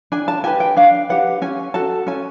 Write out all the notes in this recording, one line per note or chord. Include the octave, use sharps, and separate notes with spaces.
D4 G#5
A5
G4 B4 G#5
G5
D4 F5
G4 B4 F#5
C#4 G#5
F#4 A4 A5
C#4 G#5